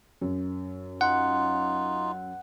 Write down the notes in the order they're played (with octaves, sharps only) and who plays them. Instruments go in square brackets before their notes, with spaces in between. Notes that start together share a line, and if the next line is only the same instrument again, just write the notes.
[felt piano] F#2
[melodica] D#4 F4 [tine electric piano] F#5